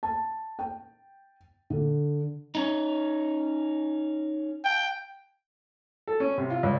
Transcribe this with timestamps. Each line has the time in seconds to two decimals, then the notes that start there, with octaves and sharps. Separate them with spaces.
0.03 A5
0.59 G5
1.70 D3
2.55 C#4 D#4
4.64 G5
6.07 A4
6.20 C#4
6.38 C3
6.50 F4
6.63 C#2